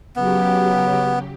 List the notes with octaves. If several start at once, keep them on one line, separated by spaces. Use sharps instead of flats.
C#3 F#3 B3 G4